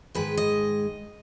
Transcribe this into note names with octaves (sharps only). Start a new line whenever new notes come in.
G#2 D#3 G#3 B4
D#5